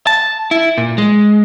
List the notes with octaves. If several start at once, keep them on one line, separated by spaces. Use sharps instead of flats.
A5
E4
A#2
G#3